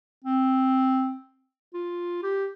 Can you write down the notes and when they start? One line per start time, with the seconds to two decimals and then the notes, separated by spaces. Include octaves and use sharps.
0.25 C4
1.74 F4
2.23 G4